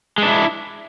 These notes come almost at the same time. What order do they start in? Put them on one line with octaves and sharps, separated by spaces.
G#3 D4 E4